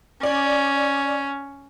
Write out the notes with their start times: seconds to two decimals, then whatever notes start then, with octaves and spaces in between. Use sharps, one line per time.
0.23 C#4 D5